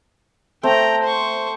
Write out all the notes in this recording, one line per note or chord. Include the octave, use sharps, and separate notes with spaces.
A3 C4 G5 A#5
C5 C#6